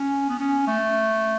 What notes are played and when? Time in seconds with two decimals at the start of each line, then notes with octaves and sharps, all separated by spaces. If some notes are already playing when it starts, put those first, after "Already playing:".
Already playing: C#4
0.29 B3
0.39 C#4
0.67 A3